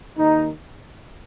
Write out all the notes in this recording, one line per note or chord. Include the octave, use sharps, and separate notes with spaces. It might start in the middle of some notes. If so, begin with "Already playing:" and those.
D#2 D#3 D#4